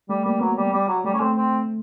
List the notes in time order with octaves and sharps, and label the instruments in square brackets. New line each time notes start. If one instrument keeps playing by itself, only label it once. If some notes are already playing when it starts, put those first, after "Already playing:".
[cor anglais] G3 [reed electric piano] A3
[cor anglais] G3 [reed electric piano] A#3
[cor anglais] F#3 [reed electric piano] B3
[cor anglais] G3
G3
F#3
[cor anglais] G3 [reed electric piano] A3
[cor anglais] C#4
[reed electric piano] A3 [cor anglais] C4
[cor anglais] C4